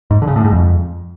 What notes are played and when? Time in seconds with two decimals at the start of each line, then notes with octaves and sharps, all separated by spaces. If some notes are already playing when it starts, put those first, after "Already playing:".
0.11 G#2
0.22 D3
0.27 C#3
0.36 A2
0.44 G#2
0.52 F2